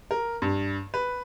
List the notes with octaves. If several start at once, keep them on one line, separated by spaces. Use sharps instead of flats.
A#4
G2
B4